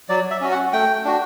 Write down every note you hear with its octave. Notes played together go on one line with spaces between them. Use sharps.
F#3 D5
E5
C#4 F#4
F#5
A3 G5
D4 F#4